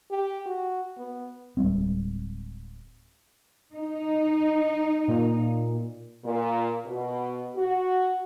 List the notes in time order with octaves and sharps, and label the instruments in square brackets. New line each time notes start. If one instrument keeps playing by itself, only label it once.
[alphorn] G4
F#4
B3
[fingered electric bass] D1 G3 G#3 C4
[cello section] D#4
[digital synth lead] A#2
[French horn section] A#2
B2
F#4